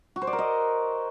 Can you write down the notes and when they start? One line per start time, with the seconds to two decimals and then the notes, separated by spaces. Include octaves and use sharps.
0.16 F#4
0.22 C5
0.27 D5
0.33 A#4
0.38 D#5